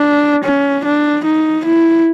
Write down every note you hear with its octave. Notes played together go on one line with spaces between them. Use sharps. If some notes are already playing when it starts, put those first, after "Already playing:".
Already playing: D4
C#4
D4
D#4
E4